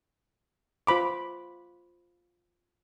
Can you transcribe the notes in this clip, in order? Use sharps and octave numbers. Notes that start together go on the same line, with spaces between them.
F4 C5 B5 D6